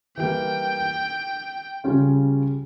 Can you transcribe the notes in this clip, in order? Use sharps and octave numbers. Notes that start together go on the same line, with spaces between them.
E3 G3 A#3 G5
C#3 G3 C#4 F4